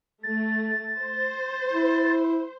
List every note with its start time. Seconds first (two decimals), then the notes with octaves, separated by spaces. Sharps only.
0.23 A3 A6
0.99 C5
1.73 E4